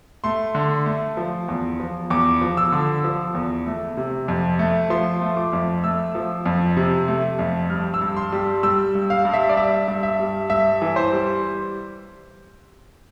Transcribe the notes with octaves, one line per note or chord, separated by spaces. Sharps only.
A3 C6
D3
A3
F3
E2
F3
E2 D6
F3
E6
D3
F3
E2
A3
C3
F2
A3
F3 C6
A3
D6
F2
A3 E6
F3
F2
C3
A3
F2
G2 F6
E6
G2
C6
G3
G3 E6
G2
F5
G2
E5
D5
G2 E5
G2
E5
G3
G2 E5
E3
C5
G3